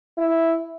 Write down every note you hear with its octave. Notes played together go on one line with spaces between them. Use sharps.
E4